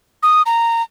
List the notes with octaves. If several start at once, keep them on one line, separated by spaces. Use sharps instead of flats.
D#6
A#5